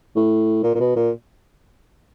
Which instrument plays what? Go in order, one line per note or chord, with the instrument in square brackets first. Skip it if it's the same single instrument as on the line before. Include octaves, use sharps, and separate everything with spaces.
[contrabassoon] A2
A#2
A#2
B2
A#2